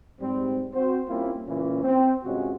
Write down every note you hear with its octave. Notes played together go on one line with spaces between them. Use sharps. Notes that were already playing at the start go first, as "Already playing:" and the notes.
G#2 G3 C4
C4 F#4 C5
G3 A#3 C4 C#4 E4 F4
C#2 A#2 E3 C#4
C4
G2 C3 G#3 C#4 F4 F#4